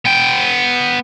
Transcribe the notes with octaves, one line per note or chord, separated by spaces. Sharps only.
B3 G5